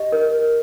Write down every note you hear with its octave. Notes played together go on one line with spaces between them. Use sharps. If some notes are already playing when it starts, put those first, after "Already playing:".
Already playing: G4 D#5
A#4